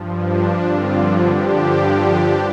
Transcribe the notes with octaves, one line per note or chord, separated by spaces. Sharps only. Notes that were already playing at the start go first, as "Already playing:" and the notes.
Already playing: G2 F3
D4
G2 D3 F3 C4 F4
D4
D4 G4
G2 D3 F3